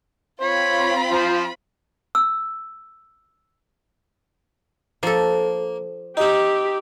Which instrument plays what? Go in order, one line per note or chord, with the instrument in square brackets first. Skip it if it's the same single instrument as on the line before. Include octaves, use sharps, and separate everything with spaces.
[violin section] C4 F4 B5 [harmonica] C#5
[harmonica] F3 C5
[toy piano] E6
[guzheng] F3 A4 [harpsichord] A#3
[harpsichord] C4 D#4 [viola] G4